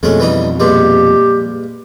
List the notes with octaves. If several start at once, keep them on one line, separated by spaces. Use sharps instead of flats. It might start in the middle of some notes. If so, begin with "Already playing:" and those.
F2 B2 G#3 A3 C#4
E3 G3 D#4
G2 A#2 G#3 G4